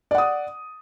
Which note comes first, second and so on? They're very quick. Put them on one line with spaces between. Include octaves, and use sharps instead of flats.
D5 F#5 D#6